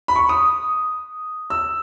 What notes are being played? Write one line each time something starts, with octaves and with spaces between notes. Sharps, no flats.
B5
C#6
D#6
E6